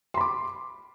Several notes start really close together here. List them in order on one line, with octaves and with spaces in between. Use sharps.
C6 B5 D6